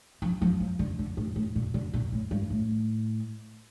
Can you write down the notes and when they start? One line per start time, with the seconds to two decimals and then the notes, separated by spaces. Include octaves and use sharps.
0.22 F3
0.42 F3
0.60 F3
0.79 D3
0.99 D3
1.17 A2
1.36 A2
1.55 A#2
1.74 D3
1.93 A#2
2.12 A2
2.31 G2
2.50 A2